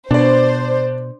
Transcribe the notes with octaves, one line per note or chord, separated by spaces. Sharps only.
B2 D4 C5 D5